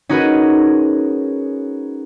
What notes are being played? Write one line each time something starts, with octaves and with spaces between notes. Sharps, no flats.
C#4 D#4 F#4 G#4 A#4 B4